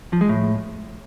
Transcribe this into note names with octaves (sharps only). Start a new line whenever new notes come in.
F3
G#3
A2